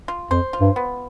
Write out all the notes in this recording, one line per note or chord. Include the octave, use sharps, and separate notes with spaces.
F4
F2 C5
F4
G2
B3